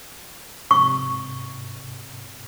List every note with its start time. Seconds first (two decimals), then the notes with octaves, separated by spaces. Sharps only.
0.71 G#2 C3 C#6